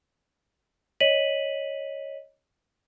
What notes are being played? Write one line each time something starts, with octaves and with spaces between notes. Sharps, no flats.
C#5 D#5 B6 D#7 F#7